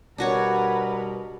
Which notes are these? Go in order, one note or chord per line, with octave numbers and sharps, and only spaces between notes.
B2 G3 D4 F#4 A#4 B4 C#5